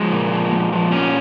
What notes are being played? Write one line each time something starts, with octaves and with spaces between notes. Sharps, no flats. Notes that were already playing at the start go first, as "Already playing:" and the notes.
Already playing: F3 G#3
A#2
F3
A#2
F3
A#2 C#4